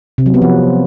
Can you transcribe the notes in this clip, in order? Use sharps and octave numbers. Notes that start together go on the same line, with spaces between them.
C3
F#3
B3
F3